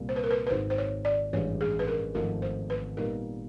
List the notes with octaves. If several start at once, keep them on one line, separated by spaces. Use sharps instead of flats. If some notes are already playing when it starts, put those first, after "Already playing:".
Already playing: C2 A#2 G3 A#3
C5
B4
A#4
B4
B4
G#1 G#2 D#3 C5
C5
C#5
D5
A1 G2 E3 G#3 C#5
G#4
B4
A#4
G#1 G#2 F3 A3 A#4
C5
B4
A#2 G3 B3 D#4 A#4